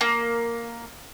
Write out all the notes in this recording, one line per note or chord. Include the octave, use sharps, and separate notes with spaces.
A#3